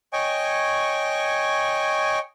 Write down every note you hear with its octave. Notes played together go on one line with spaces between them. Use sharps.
C#5 D#5 G5 G#5 C#6